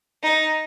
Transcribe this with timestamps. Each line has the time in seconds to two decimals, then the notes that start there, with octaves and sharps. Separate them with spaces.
0.23 D#4